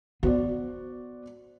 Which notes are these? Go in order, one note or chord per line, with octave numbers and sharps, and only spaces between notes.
B3 F#4 C5 D5